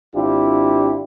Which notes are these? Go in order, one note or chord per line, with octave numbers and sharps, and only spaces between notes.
G#1 C4 D4 E4 F4 G4